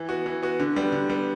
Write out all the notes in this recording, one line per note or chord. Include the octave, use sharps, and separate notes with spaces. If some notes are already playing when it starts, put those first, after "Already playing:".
Already playing: E3
B3 F#4
E3
B3 F#4
D3
G3 B3
D3
G3 B3